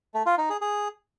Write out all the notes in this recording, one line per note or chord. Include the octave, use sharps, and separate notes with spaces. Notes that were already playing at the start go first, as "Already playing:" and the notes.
A3
F4
D#4
G#4
G#4